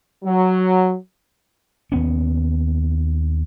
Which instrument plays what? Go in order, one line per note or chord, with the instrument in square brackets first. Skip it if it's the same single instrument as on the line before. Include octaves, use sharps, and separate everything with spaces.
[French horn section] F#3
[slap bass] D#2 B3 C#4